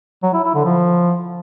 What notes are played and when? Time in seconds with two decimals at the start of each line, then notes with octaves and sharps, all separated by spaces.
0.23 F#3
0.33 E4
0.44 E4
0.54 D3
0.65 F3